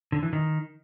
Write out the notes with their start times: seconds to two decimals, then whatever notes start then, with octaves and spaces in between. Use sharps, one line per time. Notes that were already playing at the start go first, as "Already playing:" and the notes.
0.12 D3
0.23 E3
0.33 D#3